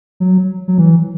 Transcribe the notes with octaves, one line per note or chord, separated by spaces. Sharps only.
F#3
F#3
E3